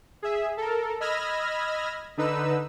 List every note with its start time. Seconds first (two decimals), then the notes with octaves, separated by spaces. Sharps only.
0.22 G#4 E5
0.57 A4 A#4
1.00 D#5 B5 E6 F6 G#6 A#6
2.17 D3 D#4 B4 E6